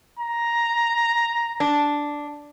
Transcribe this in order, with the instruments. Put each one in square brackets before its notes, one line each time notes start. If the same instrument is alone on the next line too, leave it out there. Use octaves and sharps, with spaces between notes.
[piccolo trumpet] A#5
[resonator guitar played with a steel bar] D4